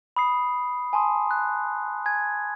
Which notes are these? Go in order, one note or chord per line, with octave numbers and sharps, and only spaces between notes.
B5 D#6 C7
G#5 A5 C6 D#6
F#6
G#5 G#6